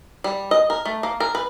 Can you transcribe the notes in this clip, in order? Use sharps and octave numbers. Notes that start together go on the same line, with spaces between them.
G3
D#5
A#4
A3
A#3
A#4
B4